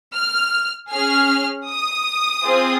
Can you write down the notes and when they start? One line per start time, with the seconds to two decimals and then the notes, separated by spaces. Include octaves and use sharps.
0.16 F6
0.91 C#4 G#4 F6
1.68 D#6
2.44 C4 F4 G#4